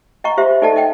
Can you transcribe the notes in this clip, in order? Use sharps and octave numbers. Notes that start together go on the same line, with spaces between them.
D#5 F#5 A#5 C#6
F4 G4 C5 E5
D#4 A4 D5 D#5 F#5 A5
D#5 F#5 G5